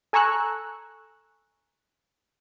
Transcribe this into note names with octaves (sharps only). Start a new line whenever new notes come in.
A4 G#5 A#5 C#6 E6 F#6